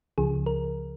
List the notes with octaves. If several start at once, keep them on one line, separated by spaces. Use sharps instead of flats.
C#2 C#3 F3 G#4
A#4